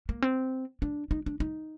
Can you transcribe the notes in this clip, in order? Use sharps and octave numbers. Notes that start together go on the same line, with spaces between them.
A#3
C4
D4
D#4
D4
D#4